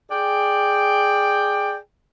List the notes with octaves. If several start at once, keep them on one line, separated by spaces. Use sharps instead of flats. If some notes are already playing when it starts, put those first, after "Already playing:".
G#4 D5 G5